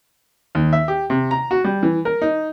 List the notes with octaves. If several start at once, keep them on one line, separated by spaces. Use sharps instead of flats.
D#2
E5
G4
C3
A#5
F#4
G3
E3
A#4
D#4